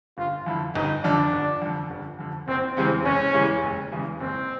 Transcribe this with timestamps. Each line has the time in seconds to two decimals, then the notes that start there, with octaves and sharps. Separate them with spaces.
0.18 G1 F4
0.46 F2 D3 E4
0.75 G1 D#4
1.03 F2 D3 D4
1.33 G1
1.62 F2 D3
1.90 G1
2.19 F2 D3
2.48 F#1 C4
2.77 E2 C#3 E3 G#3 C4
3.05 F#1 C#4
3.34 E2 C#3 E3 G#3
3.63 F#1
3.92 E2 C#3 E3 G#3
4.21 F#1 C4